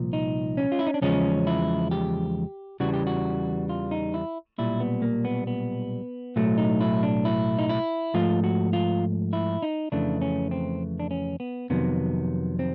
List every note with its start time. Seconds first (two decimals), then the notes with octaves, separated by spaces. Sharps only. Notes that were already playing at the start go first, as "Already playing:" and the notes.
Already playing: C2 A#2 F3
0.13 D#4
0.57 C#4
0.72 F4
0.79 E4
0.87 D#4
0.94 D4
1.01 E2 C#3 F3 G#3 C#4
1.47 E4
1.91 G4
2.80 E2 C#3 E3 G3 F#4
2.93 G4
3.07 F#4
3.69 F4
3.91 D#4
4.14 E4
4.58 B1 A#2 G3 E4
4.80 B3
5.02 A#3
5.25 B3
5.47 B3
6.36 B1 A2 F#3 A3
6.58 D#4
6.81 E4
7.03 D4
7.25 E4
7.59 D#4
7.69 E4
8.14 G#2 F3 A3 F4
8.44 F#4
8.73 F4
9.33 E4
9.62 D#4
9.92 F2 C#3 E3 A3 D4
10.21 C#4
10.51 C4
11.00 D4
11.11 C#4
11.40 B3
11.70 F2 C3 D#3 F#3 B3
12.59 C4